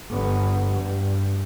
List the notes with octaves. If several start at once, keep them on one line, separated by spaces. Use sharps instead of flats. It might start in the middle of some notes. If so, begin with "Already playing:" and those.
G1 B3
G2